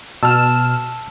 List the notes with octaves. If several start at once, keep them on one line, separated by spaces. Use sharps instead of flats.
B2 A5 E6 F6 E7